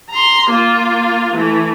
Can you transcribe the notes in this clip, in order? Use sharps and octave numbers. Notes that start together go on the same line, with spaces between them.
A#5 C6
A#3 F4
E3 A3